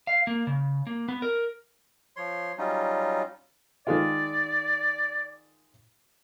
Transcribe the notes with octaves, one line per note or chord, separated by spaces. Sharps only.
F5
A#3
C#3
A#3
B3
A#4
F3 C#5 C6
F#3 G3 C#4 D#4 F4
D#3 G#3 F4 D5